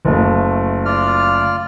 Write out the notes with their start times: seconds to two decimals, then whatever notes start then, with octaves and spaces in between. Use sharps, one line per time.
0.05 F#1 A3
0.85 F4 D5 F6